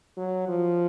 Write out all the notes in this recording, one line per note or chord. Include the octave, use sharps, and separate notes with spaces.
F#3
F3